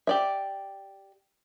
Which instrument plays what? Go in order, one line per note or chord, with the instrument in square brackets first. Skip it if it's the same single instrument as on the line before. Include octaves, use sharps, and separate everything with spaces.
[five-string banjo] G4 D5 E5